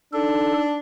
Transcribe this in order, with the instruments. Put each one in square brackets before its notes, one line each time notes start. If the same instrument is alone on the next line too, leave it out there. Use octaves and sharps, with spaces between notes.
[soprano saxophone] D4 [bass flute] D#4 [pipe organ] A4